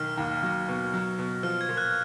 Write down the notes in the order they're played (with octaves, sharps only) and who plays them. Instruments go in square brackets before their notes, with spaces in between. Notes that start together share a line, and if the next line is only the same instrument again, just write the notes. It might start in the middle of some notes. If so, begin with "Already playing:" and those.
Already playing: [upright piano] B1 D#3 [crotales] F6
[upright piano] D#2
F#3
B2
F#3
B2
[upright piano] F3 [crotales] F6
[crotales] G#6
[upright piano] A#2
[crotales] F#6